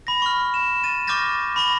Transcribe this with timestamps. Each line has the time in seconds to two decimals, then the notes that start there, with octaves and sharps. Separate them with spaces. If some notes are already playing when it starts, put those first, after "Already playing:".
0.07 B5 A#6
0.22 C#6 F6
0.54 E7
0.84 A6 D#7
1.07 C#6 D6 F6 G6 A6 A#6
1.56 B5 C#6 A#6 G7